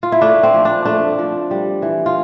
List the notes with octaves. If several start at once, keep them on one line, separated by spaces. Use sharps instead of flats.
F4
E4
A3 D4
C4
F3
D4
A3 D4
F3
G3
E3
F4